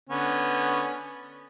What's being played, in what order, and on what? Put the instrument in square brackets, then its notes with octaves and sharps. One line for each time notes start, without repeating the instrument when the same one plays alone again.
[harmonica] D3 B3 C#4